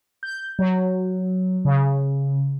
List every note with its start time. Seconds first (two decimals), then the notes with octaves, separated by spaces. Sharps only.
0.23 G6
0.59 F#3
1.65 C#3